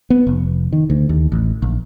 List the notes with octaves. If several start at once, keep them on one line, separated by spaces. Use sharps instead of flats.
B3
F1
D#3
D2
D#2
A1
A#1